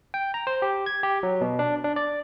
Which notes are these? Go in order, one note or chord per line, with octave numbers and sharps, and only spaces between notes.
G5
A#5
C5
G4
G#6
G4
F#3
B2
D4
D4
D5